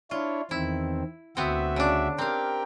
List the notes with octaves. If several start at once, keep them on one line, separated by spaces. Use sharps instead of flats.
D4 E4 F4 C#5
E2 D#3 C4 E4
D2 B3 C4 F#4 E5
C#3 D4
C4 G4 A#4 F5 G5